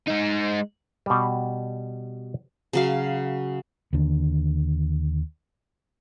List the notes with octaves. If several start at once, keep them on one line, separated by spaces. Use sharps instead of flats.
G#3 D#4
B2 G3
C#3 F#3 F5
D#2 D3